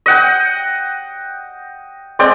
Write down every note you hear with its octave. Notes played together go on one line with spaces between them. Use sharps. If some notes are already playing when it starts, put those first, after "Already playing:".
D#5 F#5 G5
G#3 C4 D5 G5